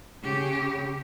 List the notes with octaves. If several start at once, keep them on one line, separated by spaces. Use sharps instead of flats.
C#3 G4